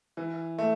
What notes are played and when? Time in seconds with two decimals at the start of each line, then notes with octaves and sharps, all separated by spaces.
0.17 E3
0.58 A3